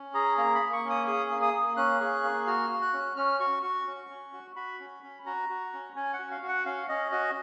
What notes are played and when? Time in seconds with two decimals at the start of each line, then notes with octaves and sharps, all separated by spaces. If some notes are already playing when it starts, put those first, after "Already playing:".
Already playing: C#4
0.14 G#4 A#5
0.38 A#3 A#5
0.55 B5
0.61 A#3
0.73 C#6
0.84 C#4
0.90 D#6
1.07 G#4 D#6
1.30 A#3
1.42 D#6
1.54 A#3
1.77 C#4 F#6
2.00 G#4
2.23 A#3
2.47 F#4 F6
2.70 F#4
2.82 F#6
2.93 C#4
3.17 C#4 F6
3.40 F#4 C#6
3.63 F#4 C#6
3.87 C#4
4.10 C#4
4.33 F#4
4.56 F#4 B5
4.80 C#4
5.03 C#4
5.26 F#4 A#5
5.49 F#4
5.73 C#4
5.96 C#4 G#5
6.13 F#5
6.19 F#4
6.31 F5
6.42 F#4
6.48 F#5
6.65 C#4 F5
6.89 C#4 D#5
7.12 F#4 D#5